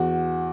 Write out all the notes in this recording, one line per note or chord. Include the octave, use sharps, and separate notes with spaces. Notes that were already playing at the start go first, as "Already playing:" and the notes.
Already playing: E2 F#4